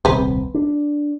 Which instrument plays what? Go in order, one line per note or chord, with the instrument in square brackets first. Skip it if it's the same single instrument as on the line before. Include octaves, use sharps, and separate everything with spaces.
[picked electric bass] D#1 C2 C4 [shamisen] B4 C5
[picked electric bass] D4